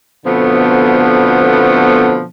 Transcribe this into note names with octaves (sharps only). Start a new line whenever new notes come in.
B2 D3 F3 A3 B3 C4